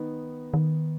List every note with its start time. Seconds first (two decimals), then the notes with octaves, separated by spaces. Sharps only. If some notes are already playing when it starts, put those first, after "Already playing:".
Already playing: D#3 B3 D#4
0.54 D#3